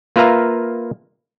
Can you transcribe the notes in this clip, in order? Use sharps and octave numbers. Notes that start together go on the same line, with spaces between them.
A#3 F4 B4 E5 F5 A#5